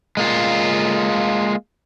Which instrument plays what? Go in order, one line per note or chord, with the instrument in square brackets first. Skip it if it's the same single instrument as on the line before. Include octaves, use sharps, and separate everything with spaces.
[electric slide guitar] G#3 A#3 F4